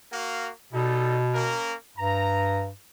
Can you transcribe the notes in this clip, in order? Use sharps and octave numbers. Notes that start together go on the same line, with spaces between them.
A#3 F#4 F5
B2 G3 D#4 A4
A#3 C#4 A#4
G2 A#5